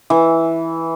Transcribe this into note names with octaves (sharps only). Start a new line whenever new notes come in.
E3